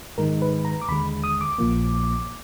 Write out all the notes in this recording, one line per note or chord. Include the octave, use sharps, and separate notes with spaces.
G#2 D#3 G#3 D#4 A#4
B4
A#5
D6
D#2 D3 G#3 B5
D#6
D6
A#1 A#2 F3 A#3